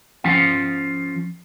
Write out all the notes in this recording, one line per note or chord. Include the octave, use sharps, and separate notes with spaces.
F3 C#4 F4 F5